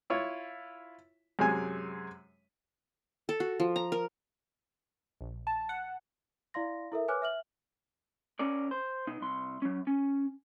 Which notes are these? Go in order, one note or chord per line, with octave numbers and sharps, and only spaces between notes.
E4 F4 C#5
F#2 C3 G#3 C#4 G#5
A4
F#4
F3
A#5
A#4
A#1
A5
F#5
E4 D5 F5 C6 A#6
E4 A4 A#4 E5
B4 C#5 G#5 D6 F6 F#6
E5 F6 F#7
C#4 A#4 D5
C5
B2 D#4
C2 C6
F#3 C#4
C#4